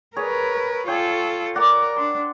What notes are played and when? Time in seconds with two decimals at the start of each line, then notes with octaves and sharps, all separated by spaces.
0.16 G#4 A#4 B4 C#5 G#5
0.87 F4 A4 C#5 G5 G#5
1.56 A#4 D5 F#5 D6
1.96 D4 C6